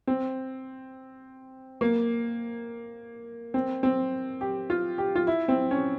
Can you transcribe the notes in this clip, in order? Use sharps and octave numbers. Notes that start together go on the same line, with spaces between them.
C4
A#3
C4
C4
G4
F4
G4
F4
E4
C4
C#4